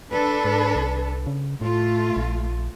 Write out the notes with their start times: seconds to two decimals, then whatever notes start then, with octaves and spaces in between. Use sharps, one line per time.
0.11 D4 A4 B4
0.45 G#2
0.76 C2
1.27 C#3
1.61 A2 A3 F4
2.16 A#1